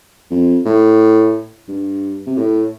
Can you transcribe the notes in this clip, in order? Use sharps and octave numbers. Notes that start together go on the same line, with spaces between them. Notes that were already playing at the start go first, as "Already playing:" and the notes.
F2
A2
G2
C3
A2